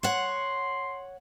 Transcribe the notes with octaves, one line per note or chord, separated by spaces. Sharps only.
C#5 F#5 C6